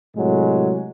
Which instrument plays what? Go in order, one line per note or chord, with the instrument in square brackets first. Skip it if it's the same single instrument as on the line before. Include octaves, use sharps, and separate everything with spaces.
[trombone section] A2 C3 F#3 G#3